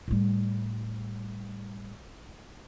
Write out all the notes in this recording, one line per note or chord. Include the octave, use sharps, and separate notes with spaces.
A2 G3